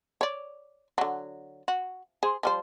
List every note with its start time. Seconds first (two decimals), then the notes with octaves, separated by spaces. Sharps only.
0.21 C#5 D5
0.98 D3 F#3
1.68 F#4
2.23 G#4 C5
2.43 F3 G3 C5